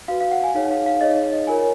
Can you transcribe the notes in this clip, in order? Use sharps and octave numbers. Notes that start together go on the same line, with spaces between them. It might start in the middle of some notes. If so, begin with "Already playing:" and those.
F#4 B4 F5
F5
F#5
G#5
D#4 G#4 C#5 F5
F5
F5
D#4 G#4 C#5 D#5
D#5
F4 A#4 C#5 G#5